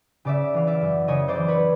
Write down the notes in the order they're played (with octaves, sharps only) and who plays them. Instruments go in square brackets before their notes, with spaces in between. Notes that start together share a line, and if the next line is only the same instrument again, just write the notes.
[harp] C#3 D5 E5
E3 F5
D5 E5
F#2
C#3 C#5 D#5
C5 D5
E3
B4 C#5